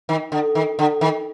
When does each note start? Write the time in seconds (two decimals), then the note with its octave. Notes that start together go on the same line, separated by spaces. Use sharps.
0.09 D#3
0.32 D3
0.55 D#3
0.79 D3
1.01 D#3